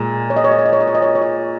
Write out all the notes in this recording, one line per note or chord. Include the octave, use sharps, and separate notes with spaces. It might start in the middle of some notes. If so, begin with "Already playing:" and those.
Already playing: A#2 G#3
C#5
D#5
C#5
D#5
C#5
D#5
C#5
D#5
C#5
D#5
C#5
C#5
D#5